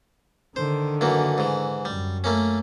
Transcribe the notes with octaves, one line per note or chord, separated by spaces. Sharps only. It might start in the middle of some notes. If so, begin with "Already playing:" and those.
D3 D#3 C5
F#2 E3 A#3
G#2 E3
F#2 G3
A3 A#3 C#4